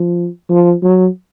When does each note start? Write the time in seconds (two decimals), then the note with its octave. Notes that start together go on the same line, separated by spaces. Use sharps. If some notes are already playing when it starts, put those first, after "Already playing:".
Already playing: F3
0.50 F3
0.83 F#3